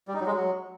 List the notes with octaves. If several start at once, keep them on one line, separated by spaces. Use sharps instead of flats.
G3
D#4
F#3
G#3
F#3